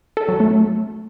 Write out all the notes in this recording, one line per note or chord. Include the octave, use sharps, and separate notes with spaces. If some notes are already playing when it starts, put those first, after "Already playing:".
A4
F#3
A3